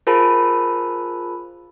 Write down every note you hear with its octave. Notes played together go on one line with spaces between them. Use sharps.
F4 G#4 A#4 C5 A5 B5